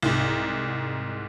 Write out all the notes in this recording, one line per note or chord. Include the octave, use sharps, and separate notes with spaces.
C2 G#2